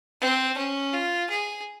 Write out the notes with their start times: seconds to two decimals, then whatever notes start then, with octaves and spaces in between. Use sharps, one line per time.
0.21 C4
0.58 C#4
0.93 F4
1.30 G#4